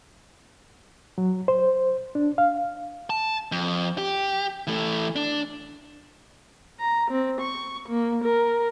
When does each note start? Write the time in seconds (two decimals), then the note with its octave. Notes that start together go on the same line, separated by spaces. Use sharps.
1.18 F#3
1.48 C5
2.15 D4
2.38 F5
3.10 A5
3.52 F2
3.98 G4
4.67 E3 A3
5.16 D4
6.80 A#5
7.11 C4
7.41 C#6
7.89 A#3
8.24 A#4